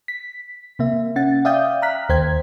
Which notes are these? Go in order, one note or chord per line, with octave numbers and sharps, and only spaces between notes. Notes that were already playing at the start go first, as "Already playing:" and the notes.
B6
C3 A#3 E5
C#4 F#5 A6
D5 E5 F5 G5 D#6 G6
A#5 F6 F#6 B6
D#2 C5 G5 G#6